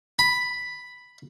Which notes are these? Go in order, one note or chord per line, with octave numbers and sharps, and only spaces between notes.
B5